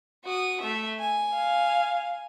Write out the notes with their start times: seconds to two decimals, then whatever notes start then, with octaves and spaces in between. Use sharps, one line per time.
0.25 F#4 D#6
0.61 A3 E5
1.00 G#5
1.34 F5